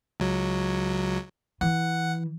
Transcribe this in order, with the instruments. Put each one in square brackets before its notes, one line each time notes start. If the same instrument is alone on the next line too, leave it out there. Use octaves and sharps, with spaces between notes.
[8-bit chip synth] C#2 F#3
[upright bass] E3 [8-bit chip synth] F#5